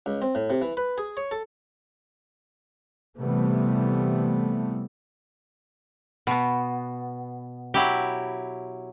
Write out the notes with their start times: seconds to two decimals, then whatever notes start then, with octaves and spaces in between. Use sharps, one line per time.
0.06 C#2
0.22 C4
0.35 A2
0.50 C3
0.62 E3
0.77 B4
0.98 G#4
1.17 C#5
1.31 A4
3.18 C3 E3 G3 A3 B3
6.27 B2 B3
7.74 F#3 E4 G4